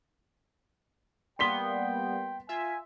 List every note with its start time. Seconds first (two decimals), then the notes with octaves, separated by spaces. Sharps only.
1.39 G3 A#3 B3 G5 C6 B6 G7
2.49 F4 E5 G#5